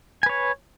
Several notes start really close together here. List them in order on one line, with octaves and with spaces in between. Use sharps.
G#5 B4 C#5